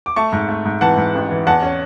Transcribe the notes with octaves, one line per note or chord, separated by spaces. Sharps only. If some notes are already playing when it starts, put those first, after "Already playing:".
D6
A3 A5 C#6
G#2
A3
G#2
E3 F#5 A5
G#2
A1
E3
E2 F#5 A5
C#4